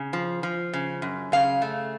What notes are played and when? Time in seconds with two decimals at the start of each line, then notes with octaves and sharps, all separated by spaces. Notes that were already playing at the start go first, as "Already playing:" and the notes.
Already playing: C#3
0.13 F3
0.43 F3
0.73 C#3
1.02 F#2
1.32 C#3 F5
1.62 A3